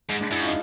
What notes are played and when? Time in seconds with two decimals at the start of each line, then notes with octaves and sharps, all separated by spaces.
0.09 G#2 G#3
0.21 D4
0.30 F#2 E4
0.41 F4
0.47 D#4